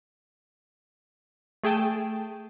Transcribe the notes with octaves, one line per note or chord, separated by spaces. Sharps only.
A3 G#4 G5 A5 D#7